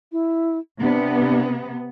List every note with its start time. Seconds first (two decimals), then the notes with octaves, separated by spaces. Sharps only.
0.12 E4
0.81 C3 B3 D4